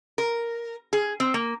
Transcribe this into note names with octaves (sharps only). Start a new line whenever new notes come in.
A#4
G#4
C4
A#3